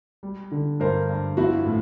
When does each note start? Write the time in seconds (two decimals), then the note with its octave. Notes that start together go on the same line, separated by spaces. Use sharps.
0.23 G3
0.52 D3
0.80 G2 A#4 C5
1.09 G2
1.37 F3 E4 F#4
1.66 A2